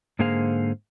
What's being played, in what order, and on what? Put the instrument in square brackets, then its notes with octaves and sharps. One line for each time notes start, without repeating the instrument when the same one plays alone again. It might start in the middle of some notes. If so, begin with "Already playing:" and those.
[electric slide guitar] G#2 D3 A#3 G#4 C5 F5